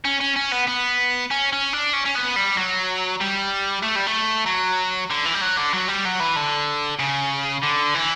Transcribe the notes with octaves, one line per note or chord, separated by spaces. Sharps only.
C#4
C#4
C#4
B3
B3
C#4
C#4
D4
C#4
C#4
B3
G3
F#3
G3
A3
G3
A3
F#3
D3
E3
G3
F#3
D3
F#3
G3
F#3
E3
D3
C#3
D3
E3